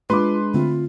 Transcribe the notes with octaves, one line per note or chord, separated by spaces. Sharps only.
G#3 D4 F4 B4 C6 D6
D3 A3 C4 F4